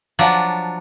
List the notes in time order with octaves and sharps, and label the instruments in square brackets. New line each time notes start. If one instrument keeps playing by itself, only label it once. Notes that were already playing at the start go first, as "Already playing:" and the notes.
[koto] F3 F#3 D4